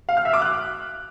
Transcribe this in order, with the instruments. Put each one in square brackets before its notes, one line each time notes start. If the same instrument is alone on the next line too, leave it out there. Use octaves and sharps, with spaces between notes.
[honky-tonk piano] F5
F6
E5
D6
F#6